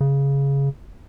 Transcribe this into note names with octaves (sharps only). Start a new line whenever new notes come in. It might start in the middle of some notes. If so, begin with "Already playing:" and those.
C#3